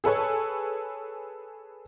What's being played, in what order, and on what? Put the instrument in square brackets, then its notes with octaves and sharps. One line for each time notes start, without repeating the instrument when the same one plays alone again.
[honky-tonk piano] G#4 A4 B4 C#5